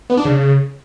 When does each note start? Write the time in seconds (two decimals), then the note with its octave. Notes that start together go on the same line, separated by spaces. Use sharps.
0.10 B3
0.17 D4
0.25 C#3